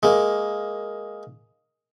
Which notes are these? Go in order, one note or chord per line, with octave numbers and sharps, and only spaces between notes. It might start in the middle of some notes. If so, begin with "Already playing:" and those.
G#3 A#3